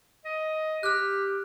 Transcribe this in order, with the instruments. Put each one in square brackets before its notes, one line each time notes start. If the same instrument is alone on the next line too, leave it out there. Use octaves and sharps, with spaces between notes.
[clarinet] D#5
[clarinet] G4 [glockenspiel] F6 F#6